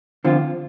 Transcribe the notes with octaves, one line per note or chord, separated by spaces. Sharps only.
D3 F3 C4 F4